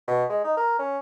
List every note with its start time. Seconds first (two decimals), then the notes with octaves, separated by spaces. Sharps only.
0.08 B2
0.29 G#3
0.44 D#4
0.57 A#4
0.79 C#4